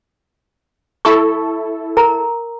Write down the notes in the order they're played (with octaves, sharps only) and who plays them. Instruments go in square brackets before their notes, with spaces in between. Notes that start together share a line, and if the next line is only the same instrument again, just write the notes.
[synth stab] E4 A4 [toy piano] C#6
[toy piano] A#4 A#5